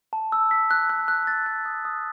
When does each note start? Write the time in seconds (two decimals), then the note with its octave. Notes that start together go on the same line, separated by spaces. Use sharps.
0.13 A5
0.32 E6
0.51 B6
0.71 F#6
0.90 F#6
1.08 F#6
1.27 A6
1.46 F#6
1.66 D#6
1.85 D#6